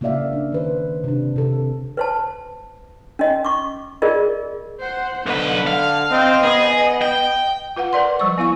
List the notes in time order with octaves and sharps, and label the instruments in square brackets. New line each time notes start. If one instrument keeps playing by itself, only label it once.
[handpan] C#3 A#3 F#4 D5 E5 F5
D4
D#3 B4 C5
C3 D4
C3 A4
[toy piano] B4 C5 A5
C#4 D#5
C#6 D6
F4 G#4 A#4 D5 D#5
[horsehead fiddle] C5 F#5
[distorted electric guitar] B1 B4 [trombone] D3 [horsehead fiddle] F#5
[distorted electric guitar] F5
[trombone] C4 [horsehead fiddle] D#5
[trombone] B3 [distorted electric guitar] G#4
[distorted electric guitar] G5
[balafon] F4 B4 F5 F#5
A#4 B4 D5 C6
F3 G3 C5 C#6
B3 E4 F5 C#6